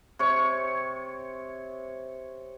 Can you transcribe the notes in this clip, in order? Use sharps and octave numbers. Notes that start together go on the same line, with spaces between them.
C3 C#5 C#6